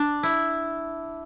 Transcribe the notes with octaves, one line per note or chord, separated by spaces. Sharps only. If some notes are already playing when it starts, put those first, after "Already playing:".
Already playing: D4
E4